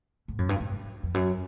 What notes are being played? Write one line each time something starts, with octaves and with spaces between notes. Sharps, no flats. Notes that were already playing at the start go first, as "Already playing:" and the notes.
G#2
F#2
G2
G#2
G#2
F2
F#2